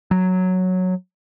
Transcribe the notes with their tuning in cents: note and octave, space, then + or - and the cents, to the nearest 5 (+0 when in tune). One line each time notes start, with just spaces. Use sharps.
F#3 -5